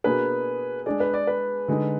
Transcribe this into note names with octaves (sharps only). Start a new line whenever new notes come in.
B2 A#3 D4 G#4 B4
G#3 D4 G#4 D5
B4
D5
B4
D3 G#3 D#4